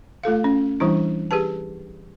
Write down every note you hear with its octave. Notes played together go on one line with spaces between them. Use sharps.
A3 F4 A4 F5
C#4
E3 G3 D4 E4
G4 G#4 B4 A5